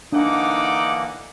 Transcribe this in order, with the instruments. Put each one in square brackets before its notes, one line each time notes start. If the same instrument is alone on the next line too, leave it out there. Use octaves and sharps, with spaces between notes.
[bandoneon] D3 E3 A#3 [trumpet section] A3 F#5 D6 [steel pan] D4 [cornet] D#4